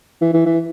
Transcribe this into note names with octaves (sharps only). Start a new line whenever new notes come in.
E3
E3
E3